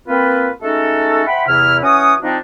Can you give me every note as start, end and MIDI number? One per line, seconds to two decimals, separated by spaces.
0.08 0.50 58
0.08 0.50 60
0.08 0.50 65
0.08 0.50 71
0.62 1.22 56
0.62 1.22 57
0.62 1.22 61
0.62 1.22 63
0.62 1.22 66
0.62 1.22 69
1.27 1.48 72
1.27 1.48 76
1.27 1.48 78
1.27 1.48 79
1.27 1.48 83
1.48 1.78 40
1.48 1.78 48
1.48 1.78 64
1.48 1.78 89
1.83 2.15 52
1.83 2.15 61
1.83 2.15 66
1.83 2.15 73
1.83 2.15 78
1.83 2.15 87
2.23 2.39 53
2.23 2.39 60
2.23 2.39 62
2.23 2.39 63